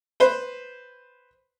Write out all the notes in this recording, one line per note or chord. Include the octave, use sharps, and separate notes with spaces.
B4 C5